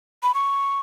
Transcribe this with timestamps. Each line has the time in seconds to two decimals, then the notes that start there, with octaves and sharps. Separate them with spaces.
0.23 B5
0.34 C#6